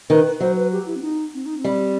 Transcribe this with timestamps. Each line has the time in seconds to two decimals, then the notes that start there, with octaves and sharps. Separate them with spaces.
0.10 D#3 B4
0.40 F#3 C5
0.57 B4
0.72 G4
0.87 E4
0.96 C4
1.02 D#4
1.34 C4
1.46 D#4
1.57 C4
1.64 G3